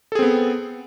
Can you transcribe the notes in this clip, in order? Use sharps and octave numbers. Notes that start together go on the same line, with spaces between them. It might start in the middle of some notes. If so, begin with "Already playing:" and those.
B3 C4 G#4 A4